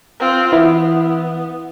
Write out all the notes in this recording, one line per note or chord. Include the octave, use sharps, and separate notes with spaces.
C4 F4
E3 B3 E4